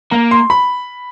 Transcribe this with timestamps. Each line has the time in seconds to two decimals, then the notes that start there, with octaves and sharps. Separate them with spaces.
0.11 A#3 A#5
0.31 C6
0.50 B5